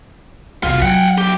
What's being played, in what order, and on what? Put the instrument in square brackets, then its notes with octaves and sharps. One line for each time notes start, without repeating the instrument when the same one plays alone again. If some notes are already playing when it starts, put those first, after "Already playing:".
[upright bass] C2 F2 [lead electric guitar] B2 F4
[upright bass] F#3 [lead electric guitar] F#5 G5
[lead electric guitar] B1 G4